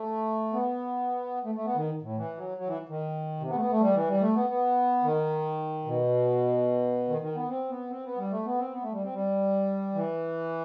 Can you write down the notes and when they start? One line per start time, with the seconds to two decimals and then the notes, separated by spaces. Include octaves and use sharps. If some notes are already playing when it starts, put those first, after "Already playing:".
Already playing: A3
0.53 B3
1.45 A3
1.55 A3
1.65 B3
1.76 D#3
2.02 A2
2.17 E3
2.37 F#3
2.58 F#3
2.67 E3
2.89 D#3
3.40 C3
3.50 B3
3.56 A3
3.60 B3
3.71 A3
3.81 G3
3.94 E3
4.08 G3
4.21 A3
4.35 B3
4.49 B3
5.04 D#3
5.85 B2
7.08 D#3
7.22 D#3
7.35 B3
7.49 C4
7.70 B3
7.90 C4
8.05 B3
8.18 G3
8.31 A3
8.45 B3
8.58 C4
8.73 B3
8.82 A3
8.92 G3
9.04 C4
9.13 G3
9.94 E3